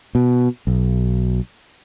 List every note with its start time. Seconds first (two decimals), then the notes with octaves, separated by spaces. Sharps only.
0.15 B2
0.67 B1